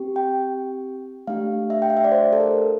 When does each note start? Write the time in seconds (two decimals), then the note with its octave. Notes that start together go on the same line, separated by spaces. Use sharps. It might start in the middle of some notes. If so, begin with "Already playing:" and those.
Already playing: C4 G4
0.16 G5
1.27 A3 D4 G4 F5
1.70 E5
1.82 G5
1.90 F5
1.97 E5
2.04 D5
2.12 C5
2.33 A4
2.40 A#4